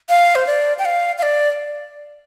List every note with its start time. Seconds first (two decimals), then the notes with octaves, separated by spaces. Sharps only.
0.09 F5
0.35 C5
0.47 D5
0.79 G5
0.85 F5
1.18 F5
1.23 D5